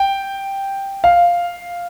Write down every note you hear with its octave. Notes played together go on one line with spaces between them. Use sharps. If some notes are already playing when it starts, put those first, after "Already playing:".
Already playing: G5
F5